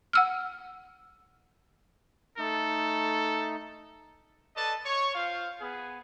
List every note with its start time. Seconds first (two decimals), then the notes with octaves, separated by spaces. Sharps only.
0.13 F#5 E6 F6
2.38 A3 D#4 A4
4.56 A4 B4 D5 D#5 A5
4.85 C#5 C#6
5.15 F4 C5 F5
5.61 B3 G#4